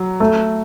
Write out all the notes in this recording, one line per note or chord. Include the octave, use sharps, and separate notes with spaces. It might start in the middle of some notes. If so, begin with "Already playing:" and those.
Already playing: F#3
A3